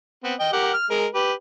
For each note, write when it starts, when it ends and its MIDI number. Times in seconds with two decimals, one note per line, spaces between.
0.24 0.34 59
0.24 0.34 60
0.40 0.52 75
0.40 0.52 79
0.53 0.72 67
0.53 0.72 70
0.53 0.72 78
0.74 0.87 89
0.90 1.06 56
0.90 1.06 70
1.15 1.32 67
1.15 1.32 71